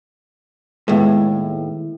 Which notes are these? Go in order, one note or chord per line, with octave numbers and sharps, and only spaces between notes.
D#2 A2 G#3 B3 E4